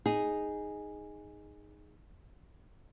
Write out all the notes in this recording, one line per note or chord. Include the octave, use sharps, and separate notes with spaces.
D#4 G#4